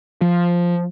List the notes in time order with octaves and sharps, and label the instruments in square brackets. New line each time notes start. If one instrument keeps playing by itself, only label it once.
[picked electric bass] F3